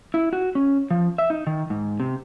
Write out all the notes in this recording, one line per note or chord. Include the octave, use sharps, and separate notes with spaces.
E4
F#4
C#4
F3
E5
D#4
D#3
G#2
C3